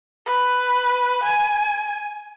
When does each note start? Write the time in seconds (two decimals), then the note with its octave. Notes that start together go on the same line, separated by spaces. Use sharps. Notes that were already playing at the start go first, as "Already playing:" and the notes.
0.26 B4
1.24 G#5